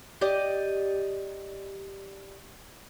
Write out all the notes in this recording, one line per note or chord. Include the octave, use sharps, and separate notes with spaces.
G4 D5 D#5